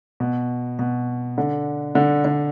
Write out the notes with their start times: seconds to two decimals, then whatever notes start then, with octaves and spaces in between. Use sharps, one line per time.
0.20 B2
0.79 B2
1.38 D3
1.95 D3
2.25 D3